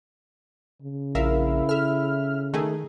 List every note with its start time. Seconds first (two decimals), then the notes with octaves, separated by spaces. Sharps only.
0.82 C#3
1.15 A#1 E4 A#4 E5 F5
1.69 A4 E5 F6
2.54 D#3 A3 D#4 G#4